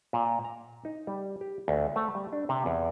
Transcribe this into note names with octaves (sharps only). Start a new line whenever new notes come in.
A#2
A#5
D#4
G3
G4
D2
A3
G3
D4
C3
E2